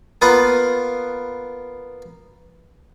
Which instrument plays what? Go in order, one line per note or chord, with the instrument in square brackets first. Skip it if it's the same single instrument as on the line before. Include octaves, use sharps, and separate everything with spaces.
[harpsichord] A#3 B3 F4 B4